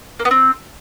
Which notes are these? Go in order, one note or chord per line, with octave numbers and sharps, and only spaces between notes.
A#3
B3
C4